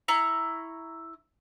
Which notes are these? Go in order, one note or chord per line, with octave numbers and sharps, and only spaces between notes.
E4 A#5 C#6